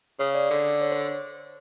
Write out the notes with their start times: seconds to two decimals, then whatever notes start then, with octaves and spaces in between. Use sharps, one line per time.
0.19 C#3 C#5
0.35 D5
0.50 D3 D5
0.81 C#5
0.92 C5